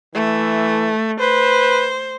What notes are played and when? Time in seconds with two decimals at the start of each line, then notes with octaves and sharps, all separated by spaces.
0.14 E3 A3
1.20 B4 C5